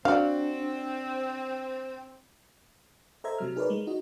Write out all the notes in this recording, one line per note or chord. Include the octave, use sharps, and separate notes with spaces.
C4 D4 F#4 D5 F5 F#5
A4 C5 D#5 E5 A#5 G#6
C3 F#3 F6
D#4 G#4 A#4 B4 C#5 D5
G#3
D#4 F#4 D#5